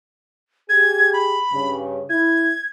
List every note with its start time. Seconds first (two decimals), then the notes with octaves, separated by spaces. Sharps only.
0.69 G4 G#4 G#6
1.13 B5
1.52 G2 C#3
2.09 E4 G#6